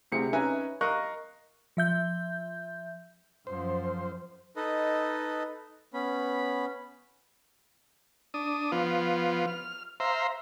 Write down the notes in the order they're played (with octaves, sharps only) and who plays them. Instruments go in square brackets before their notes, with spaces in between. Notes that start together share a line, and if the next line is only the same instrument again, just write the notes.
[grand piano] D2 C3 C4 E4 G#4 C#7
C#4 D#4 B4 E5 G#5 A#5
A#4 D#5 F5 C#6 F#6
[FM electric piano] F3 E5 G6
[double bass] F#2 F3 [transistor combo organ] C5
[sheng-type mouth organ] D#4 A4 B4 D#5
B3 C#4 B5
[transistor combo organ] D4 D#6
F3 B3 F4
F6
C5 E5 F5 A#5 C6